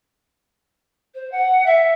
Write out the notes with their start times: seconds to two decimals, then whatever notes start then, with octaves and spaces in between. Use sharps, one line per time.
1.14 C5
1.31 F#5
1.65 E5